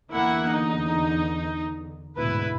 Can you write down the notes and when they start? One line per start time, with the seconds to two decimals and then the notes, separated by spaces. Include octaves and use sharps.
0.11 E2 D3 A#3 E4 F#5
0.50 D#4
2.16 D2 G#2 B2 E4 B4